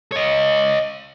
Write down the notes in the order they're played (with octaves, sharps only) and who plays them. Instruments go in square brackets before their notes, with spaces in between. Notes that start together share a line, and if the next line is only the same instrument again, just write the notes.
[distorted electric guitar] C#5 D#5